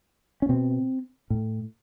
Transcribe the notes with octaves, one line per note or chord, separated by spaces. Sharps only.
C#4
B2 C4
A2